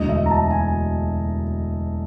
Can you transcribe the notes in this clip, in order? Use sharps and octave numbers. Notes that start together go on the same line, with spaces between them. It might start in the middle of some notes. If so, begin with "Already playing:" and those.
Already playing: E1 D2 D3 D#5
E5
A#5
A5
G#5